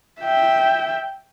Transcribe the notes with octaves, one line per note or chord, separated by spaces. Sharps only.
E5 G5